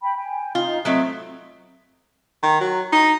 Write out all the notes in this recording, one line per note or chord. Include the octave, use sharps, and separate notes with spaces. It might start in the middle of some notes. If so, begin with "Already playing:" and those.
G5 B5
G5 G#5
D#4 F4
F#3 A3 C4 D#5 E5 D#6
D#3
F#3
D#4